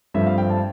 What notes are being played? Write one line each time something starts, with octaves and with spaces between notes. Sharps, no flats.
G2 F3 A3 C4 E5
F5
G5
A5